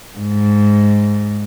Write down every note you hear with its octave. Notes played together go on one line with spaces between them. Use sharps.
G#2